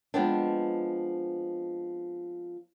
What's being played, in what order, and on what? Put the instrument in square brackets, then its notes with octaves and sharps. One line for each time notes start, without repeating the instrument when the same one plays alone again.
[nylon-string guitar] F3 G#3 B3 C4 D4